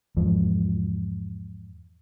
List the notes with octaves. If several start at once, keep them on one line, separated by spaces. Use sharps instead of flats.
E2 G#2 F3